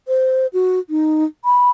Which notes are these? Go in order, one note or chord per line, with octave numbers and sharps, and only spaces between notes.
C5
F#4
D#4
B5